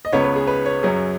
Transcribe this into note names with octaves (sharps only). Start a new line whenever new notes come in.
D#5
C#2 C#3 B3 C#5
B4
G#4
B4
C#5
F#2 F#3 C#4 G#4